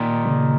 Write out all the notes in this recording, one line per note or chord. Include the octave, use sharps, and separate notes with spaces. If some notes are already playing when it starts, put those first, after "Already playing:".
Already playing: A#2 D#3
C#3